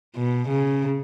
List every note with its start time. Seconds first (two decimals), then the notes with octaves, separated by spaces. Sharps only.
0.16 B2
0.49 C#3